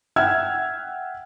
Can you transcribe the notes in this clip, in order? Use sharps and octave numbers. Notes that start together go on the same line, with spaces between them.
E5 F#5 G5 E6 F6 G#6